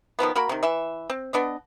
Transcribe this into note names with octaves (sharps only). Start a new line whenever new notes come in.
B2 D#3 F3 B3
A#3 F#4 A#4 B5
C3 D#3
E3 E5
C4
B3 D4 D#5